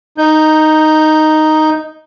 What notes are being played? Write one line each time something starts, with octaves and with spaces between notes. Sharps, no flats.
D#4 G6